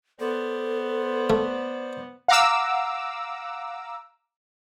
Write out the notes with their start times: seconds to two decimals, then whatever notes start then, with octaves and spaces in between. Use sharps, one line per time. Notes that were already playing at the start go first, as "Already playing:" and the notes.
0.20 B3 A4 C5 D5
1.30 A3
2.28 F5 F#5 A#5 D6 E6